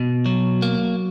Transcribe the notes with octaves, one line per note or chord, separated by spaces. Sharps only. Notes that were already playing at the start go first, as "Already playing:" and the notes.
Already playing: B2
F#3
A#3